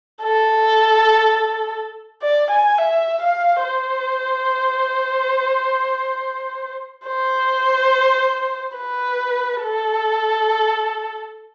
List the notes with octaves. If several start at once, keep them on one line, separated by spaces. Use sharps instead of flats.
A4
D5
G#5
E5
F5
C5
C5
B4
A4